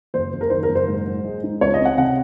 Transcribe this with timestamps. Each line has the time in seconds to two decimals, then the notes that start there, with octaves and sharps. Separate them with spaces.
0.14 F#1 C5
0.33 F#1
0.41 A#4
0.50 D#3 C5
0.63 A#4
0.68 F#1
0.75 C5
0.88 G#2
1.06 G#2
1.25 G#3
1.44 D#4
1.61 C#2 C#5
1.74 D#5
1.80 C4 F#5
1.98 C3 F#5